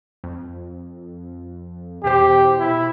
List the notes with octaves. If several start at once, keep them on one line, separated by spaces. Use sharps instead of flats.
F2
E2 B2 G4 C5
E4